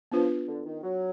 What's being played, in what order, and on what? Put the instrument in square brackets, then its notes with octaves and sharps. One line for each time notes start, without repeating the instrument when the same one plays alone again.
[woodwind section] F3 [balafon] B3 D4 F4 B4
[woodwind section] D3
D#3
F#3